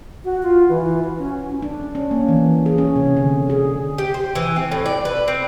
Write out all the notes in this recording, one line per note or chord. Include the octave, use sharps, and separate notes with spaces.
F#4
F4
E3
F#4
C#4
D4
C#4
A#3
E3
G#4
C#4
C3
D3
G#4
G4
C5
E3
C4
A2
D5
B4
C4